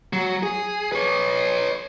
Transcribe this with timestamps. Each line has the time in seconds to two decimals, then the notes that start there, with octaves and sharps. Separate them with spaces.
0.13 F#3
0.43 G#4
0.92 B4 C#5